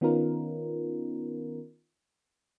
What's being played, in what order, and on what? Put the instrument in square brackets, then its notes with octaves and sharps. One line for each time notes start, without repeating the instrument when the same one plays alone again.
[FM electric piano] D#3 B3 C#4 D#4 F4 A#4